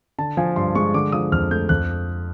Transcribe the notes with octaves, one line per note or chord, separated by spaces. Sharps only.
D3 A5
F3 G#5
G2 C6
G#3 C#6
D3 D6
F3 D#6
F2 F6
A3 G6
F2 F#6